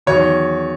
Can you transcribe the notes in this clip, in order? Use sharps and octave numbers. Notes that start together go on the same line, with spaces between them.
E2 D#3 F#3 C#5